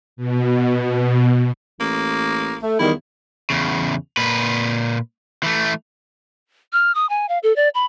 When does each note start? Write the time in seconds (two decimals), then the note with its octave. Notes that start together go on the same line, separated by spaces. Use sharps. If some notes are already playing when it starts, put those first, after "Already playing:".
0.17 B2
1.80 A1 A#3
2.62 A3
2.79 E2 D#3 G3 E4
3.50 E2 C#3
4.17 A#2 B4
5.43 E3 A3
6.73 F6
6.95 D#6
7.09 G#5
7.29 F5
7.43 A4
7.56 D5
7.74 B5